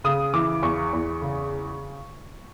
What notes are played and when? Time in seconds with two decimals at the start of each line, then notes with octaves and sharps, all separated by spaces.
0.04 C#3 D#6
0.33 E3 D6
0.63 E2 C#6
0.93 E2
1.22 C#3